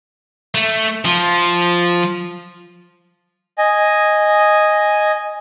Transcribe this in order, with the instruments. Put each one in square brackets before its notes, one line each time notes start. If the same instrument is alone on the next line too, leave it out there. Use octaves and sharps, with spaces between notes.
[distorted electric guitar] A3
F3
[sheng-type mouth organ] D#5 G#5